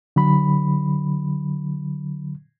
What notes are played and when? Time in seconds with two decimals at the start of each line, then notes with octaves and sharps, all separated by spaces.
0.16 D3 F#3 B5